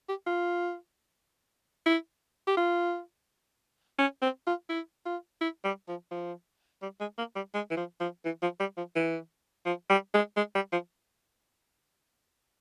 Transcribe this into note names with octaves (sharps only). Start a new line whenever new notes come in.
G4
F4
E4
G4
F4
C#4
C4
F4
E4
F4
E4
G3
F3
F3
G3
G#3
A#3
G3
G#3
E3
F3
F3
E3
F3
G3
F3
E3
F3
G3
G#3
G#3
G3
F3